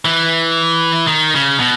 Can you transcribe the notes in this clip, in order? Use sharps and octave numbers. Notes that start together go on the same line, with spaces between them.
E3
D#3
C#3
B2